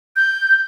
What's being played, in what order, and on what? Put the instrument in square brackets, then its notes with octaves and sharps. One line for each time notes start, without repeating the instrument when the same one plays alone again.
[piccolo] G6